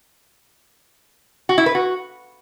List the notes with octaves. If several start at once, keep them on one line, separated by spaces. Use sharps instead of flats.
F#4
E4
B4
F#4